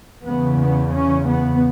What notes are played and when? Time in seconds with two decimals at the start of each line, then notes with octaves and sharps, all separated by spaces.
0.24 E2 C#3 B3
0.59 B3
0.93 C#4
1.27 B3